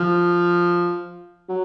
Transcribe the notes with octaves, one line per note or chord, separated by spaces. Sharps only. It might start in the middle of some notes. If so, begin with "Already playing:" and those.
Already playing: F3
F#3